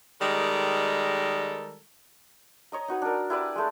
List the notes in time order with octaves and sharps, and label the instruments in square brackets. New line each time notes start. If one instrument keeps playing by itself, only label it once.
[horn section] D#3 G3 G#3 A4 A#4
[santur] C#5 D#5 A#5
D#4 F#4 B4
D4 A#4
E4 G4 B4 D5
G#3 A3